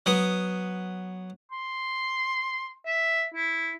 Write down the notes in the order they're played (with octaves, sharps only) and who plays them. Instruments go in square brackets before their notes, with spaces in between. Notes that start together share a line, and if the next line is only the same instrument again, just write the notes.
[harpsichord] F#3 B3 D#6
[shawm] C6
E5
E4